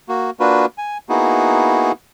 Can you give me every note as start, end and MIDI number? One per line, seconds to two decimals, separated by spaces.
0.09 0.30 58
0.09 0.30 66
0.40 0.66 58
0.40 0.66 62
0.40 0.66 65
0.40 0.66 66
0.40 0.66 71
0.78 0.98 80
1.09 1.92 58
1.09 1.92 59
1.09 1.92 63
1.09 1.92 64
1.09 1.92 66
1.09 1.92 68